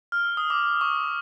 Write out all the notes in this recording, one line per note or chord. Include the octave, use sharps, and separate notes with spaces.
F6
E6
D#6
D6
C#6